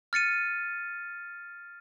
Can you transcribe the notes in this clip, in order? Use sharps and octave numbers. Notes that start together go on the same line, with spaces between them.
F6 A6 C#7 D#7